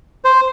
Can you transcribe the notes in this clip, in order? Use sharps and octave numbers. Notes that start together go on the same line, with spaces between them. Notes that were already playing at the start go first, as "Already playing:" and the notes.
C5